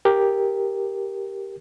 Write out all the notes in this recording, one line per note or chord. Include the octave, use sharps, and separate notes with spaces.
G4 A#4